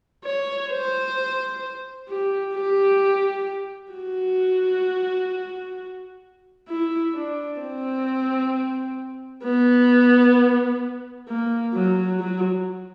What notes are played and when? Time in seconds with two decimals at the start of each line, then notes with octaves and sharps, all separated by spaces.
0.25 C#5
0.71 C5
2.09 G4
2.54 G4
3.93 F#4
6.68 E4
7.14 D4
7.60 C4
9.44 B3
11.28 A#3
11.74 F#3
12.20 F#3